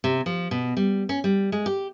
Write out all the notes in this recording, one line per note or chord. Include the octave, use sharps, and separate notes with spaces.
C3
F3
B2
G3
C#4
G3
G#3
G4